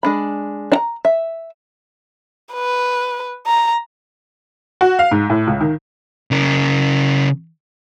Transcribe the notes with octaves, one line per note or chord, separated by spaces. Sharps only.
G#3 D4 B5
D4 A#5
E5
B4
A#5
F#4
F5
G#2
A2
C#2
D#3
C#3 A#4